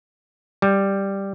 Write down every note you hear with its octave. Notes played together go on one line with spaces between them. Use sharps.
G3